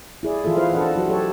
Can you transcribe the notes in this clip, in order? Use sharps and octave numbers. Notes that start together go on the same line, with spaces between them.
E4 G#4 D5
E3 F4 G#4 A4 E5
E4 F4 B4 C5 F5
D4 A4 B4 C5 D#5 F#5
F#3 F#4 B4
G4 A4 C#5